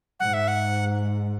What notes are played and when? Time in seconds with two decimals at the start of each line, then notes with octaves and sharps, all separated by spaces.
0.20 G#2 F#5
0.34 E5
0.48 F#5